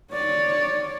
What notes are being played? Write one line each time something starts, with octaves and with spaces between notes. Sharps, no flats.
C#5 D5